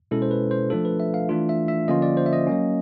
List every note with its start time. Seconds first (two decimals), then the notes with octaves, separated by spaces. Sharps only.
0.11 B2 G#3 C#4 E4 A4
0.22 C5
0.31 B4
0.51 C5
0.70 F3 A3 D4 F4 A4
0.85 B4
1.00 E5
1.14 F5
1.29 E3 A3 D4 F4
1.49 E5
1.68 E5
1.88 D3 F3 A#3 C#4 F4 D#5
2.02 D5
2.17 C5
2.26 E5
2.33 D#5
2.47 F#3 A#3 C#4